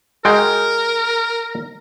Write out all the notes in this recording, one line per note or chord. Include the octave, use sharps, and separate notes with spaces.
G#3 F#4 A#4 G5